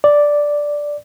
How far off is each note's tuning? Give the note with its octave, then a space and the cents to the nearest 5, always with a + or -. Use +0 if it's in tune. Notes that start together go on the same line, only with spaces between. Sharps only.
D5 +0